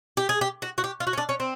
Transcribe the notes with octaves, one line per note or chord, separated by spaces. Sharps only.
G4
G#4
G4
F#4
F#4
G4
F4
F#4
C#4
D4
C#4
C4